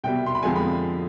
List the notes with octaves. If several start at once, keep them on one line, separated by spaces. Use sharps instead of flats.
C2 B2 G3 G5
C6
B5
F2 D3 F3 G#3 G#5
B5